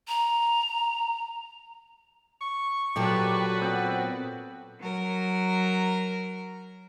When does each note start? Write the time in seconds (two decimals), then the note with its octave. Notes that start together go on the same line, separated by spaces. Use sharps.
0.08 A#5
2.41 C#6
2.96 A#2 F#3 F#4 G4 A4 B4 D5
3.62 B3 C4
4.81 F#3 A#4